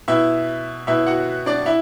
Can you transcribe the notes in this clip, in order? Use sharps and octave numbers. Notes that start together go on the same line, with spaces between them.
B2 E4 E5
B2 E4 E5
F#4 F#5
D4 D5
E4 E5